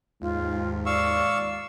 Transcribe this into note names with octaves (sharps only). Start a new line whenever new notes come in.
D#2 G#2 F4
D5 F5 C#6 E6